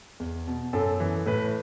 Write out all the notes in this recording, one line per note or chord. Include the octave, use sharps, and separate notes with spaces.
E2
B2
F#2 A4
E3
A2 B4